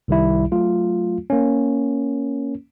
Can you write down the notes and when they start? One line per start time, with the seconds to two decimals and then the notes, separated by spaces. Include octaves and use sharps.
0.08 C2 D#3 G3 E4
0.52 F#3 A3 F4
1.30 A#3 C#4